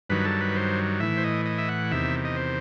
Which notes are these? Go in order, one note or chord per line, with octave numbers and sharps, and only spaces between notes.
G2 D#3 F#3 B4
A4
B4
C5
A2 E3 E5
C5
D#5
D#5
E5
F#5
E2 C3 D#3 E5
D#5
C5